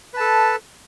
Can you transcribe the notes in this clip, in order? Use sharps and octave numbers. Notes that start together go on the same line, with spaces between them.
A4 B4 A5